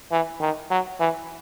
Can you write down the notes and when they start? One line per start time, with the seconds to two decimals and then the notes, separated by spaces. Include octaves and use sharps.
0.12 E3
0.41 D#3
0.71 F#3
1.00 E3